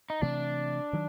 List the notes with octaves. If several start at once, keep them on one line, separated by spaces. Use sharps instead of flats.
D#4
C3 E3 A3 D4
D#3 F#3